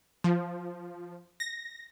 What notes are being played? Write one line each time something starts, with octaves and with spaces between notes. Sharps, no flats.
F3
A#6